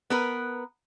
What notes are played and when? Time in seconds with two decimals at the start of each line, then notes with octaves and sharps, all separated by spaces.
0.10 B3 A#4 B4